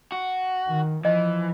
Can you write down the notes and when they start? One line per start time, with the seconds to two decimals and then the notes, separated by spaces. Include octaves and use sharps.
0.12 F#4
0.68 D#3
1.05 E3 F3 D#5